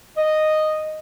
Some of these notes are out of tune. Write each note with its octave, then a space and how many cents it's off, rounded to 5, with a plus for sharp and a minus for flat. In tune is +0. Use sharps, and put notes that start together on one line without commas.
D#5 -5